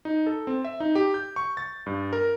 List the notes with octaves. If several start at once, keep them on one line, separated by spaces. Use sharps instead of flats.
D#4
A4
C4
E5
D#4
G4
G6
C#6
A6
G2
A#4